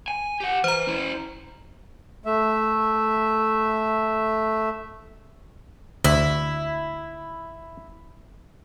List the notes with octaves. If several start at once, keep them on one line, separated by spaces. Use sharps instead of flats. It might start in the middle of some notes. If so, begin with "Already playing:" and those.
G#5
G4 F#5
E3 C5 A#5
C#4 E4
A3 E5
D2 E4